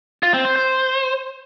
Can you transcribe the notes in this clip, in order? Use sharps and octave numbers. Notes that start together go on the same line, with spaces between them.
F4
C4
C5
C5